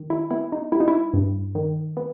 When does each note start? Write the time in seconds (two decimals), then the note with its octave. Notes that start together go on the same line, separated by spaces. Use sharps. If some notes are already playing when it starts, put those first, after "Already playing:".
Already playing: D#3
0.10 E4
0.30 B3 E4
0.52 D#4
0.72 G3 E4
0.80 D#4
0.88 E4
1.14 G2
1.55 D#3
1.97 B3